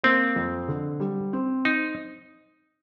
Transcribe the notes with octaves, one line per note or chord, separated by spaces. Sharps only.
A#3 C4
F2
D3
G3
C4
D#4